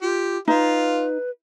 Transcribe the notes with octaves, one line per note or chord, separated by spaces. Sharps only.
F4 G4
D#4 F4 B4